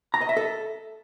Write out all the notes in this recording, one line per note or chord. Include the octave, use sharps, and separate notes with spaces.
A#5
D#5
E5
A4